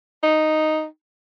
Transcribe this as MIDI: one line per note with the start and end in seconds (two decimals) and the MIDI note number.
0.23 0.85 63